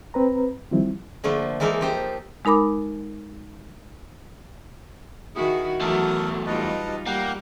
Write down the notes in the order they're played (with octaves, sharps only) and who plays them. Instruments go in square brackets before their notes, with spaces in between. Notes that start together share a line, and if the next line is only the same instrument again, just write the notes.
[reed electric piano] C4 B4 A#5
D#3 F3 G3 C4 E4
[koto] D3 F3 A3 A#3
E3 G#3 A#3 D#4 A4 A#4
F3 G4 C5
[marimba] G#3 D#4 A#4 B5 D6
[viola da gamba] D#3 E4 F#4 [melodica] G#4
[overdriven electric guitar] E2 A3 [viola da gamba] E3 F#3 [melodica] A4 A#4 D#6
[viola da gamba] G3 D#4 F4 [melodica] B4 D#5 A5
[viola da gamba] G3 [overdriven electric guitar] A#3 [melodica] F#5 G5